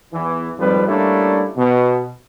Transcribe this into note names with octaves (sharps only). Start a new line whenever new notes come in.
E2 E3
G#1 F2 A2 F3 G3 B4
G3 A3 A#3 C#4 D4 E4
B2